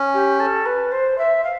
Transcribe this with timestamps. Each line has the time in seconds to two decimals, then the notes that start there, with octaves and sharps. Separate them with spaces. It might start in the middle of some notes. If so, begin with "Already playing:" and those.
Already playing: C#4
0.13 G4
0.39 A4
0.65 B4
0.91 C5
1.18 E5
1.43 F5